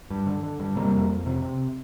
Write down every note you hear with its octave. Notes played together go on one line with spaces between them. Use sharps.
G2
D3
D3
G2
C3 G3 A#3
F2
F2
C3
C3